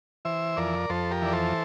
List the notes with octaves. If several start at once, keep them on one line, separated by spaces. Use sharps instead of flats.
E3 C5 E5
F2 A#4 D5
F2 A4 C5
G4 A#4
E3 D5
A4 C5